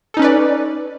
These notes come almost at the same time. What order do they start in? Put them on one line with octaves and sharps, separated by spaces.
A4 D#4 C#4 B4 D5